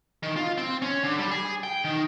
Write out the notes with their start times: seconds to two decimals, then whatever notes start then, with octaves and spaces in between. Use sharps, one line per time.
0.23 D#3
0.36 F4
0.58 C4
0.82 C#4
1.03 D3
1.18 G3
1.31 G#4
1.63 G5
1.84 D#3